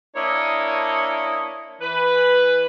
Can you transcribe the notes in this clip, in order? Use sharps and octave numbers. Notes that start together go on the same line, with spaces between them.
A#3 D4 E4 C#5 D#5
E3 B4